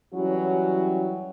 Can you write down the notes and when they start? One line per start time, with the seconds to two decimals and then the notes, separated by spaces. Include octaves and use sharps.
0.14 E3 F#3 G3 C#4 E4 F#4